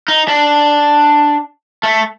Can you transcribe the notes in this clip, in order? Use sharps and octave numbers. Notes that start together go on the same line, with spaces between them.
D#4
D4
A3